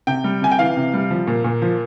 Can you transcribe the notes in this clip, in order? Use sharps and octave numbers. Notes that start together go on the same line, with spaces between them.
C3 G5
G3
C3 G#5
G5
E3 F5
C3
G3
F3
A#2
A#2
F3